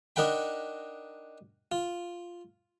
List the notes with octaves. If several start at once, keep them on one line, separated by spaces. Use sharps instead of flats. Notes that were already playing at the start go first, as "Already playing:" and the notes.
D4 D#4 A#4 F#5 G5 B5
F4